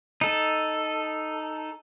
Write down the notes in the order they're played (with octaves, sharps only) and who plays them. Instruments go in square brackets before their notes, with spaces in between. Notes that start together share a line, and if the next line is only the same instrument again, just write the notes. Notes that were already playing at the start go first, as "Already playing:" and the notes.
[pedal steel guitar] D#4 A4